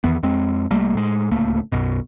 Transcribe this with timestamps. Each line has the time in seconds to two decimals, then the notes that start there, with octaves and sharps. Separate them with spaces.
0.04 E2 D#3 E3 B3
0.23 F2 G#3 C4
0.71 C2 G3 A3 A#3
0.95 A2 G#3
1.31 D1 C#2 A3 A#3
1.72 B1 F#2 B2